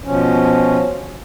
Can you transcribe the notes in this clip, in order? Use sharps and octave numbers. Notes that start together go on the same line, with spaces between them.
B2 F3 C#4